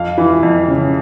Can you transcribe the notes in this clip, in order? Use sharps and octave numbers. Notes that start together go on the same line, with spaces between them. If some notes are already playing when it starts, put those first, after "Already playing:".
Already playing: F2 F5
E3
F2
C#3